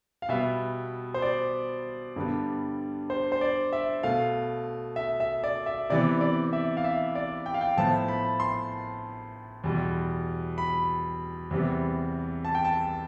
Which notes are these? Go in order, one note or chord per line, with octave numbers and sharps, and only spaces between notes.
F5
B2 G3 B3 E5
C5
D5
G2 D3 G3 B3
C5
C5
D5
E5
B2 A3 F5
E5
E5
D5
E5
C3 E3 B3 D5
D5
E5
F5
E5
D5
G5
F5
G5
A2 F3 B3 A5
B5
C6
E2 B2 G3
B5
E2 C3 G3 B3
A5
G5
A5